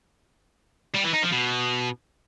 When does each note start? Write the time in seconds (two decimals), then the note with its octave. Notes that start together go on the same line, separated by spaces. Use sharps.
0.94 G3
1.04 E3
1.13 D#4
1.23 F3
1.32 B2